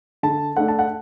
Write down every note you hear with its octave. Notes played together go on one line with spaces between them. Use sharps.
D3 A5
A3 D4 F#5
A5
F#5